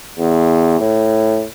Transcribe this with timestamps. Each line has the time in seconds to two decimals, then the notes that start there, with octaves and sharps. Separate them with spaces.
0.18 E2
0.80 A2